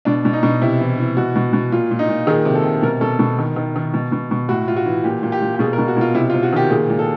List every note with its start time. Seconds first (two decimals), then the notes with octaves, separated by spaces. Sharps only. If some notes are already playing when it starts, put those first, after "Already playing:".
0.05 B2 D4
0.25 B2
0.33 D#4
0.43 B2
0.62 C3 E4
0.80 E3
0.98 E3
1.17 B2 F#4
1.36 B2
1.53 B2
1.72 A#2 F4
1.91 A#2
1.99 D#4
2.08 A#2
2.27 D#3 G#4
2.45 C3
2.55 A4
2.64 C3
2.82 B2 A#4
3.01 B2 A4
3.19 B2
3.39 D#3
3.56 D#3
3.76 D#3
3.94 B2
4.12 B2
4.31 B2
4.49 A2 F#4
4.67 A2 F4
4.76 F#4
4.86 E3
5.04 A#2 G4
5.23 A#2
5.32 G4
5.42 A#2
5.55 G4
5.59 B2 G#4
5.73 A#4
5.78 B2
5.88 F#4
5.97 B2 F4
6.15 C3 E4
6.30 F4
6.34 C3
6.43 F#4
6.53 D#3 G4
6.70 A#2 G#4
6.90 A#2
6.99 A4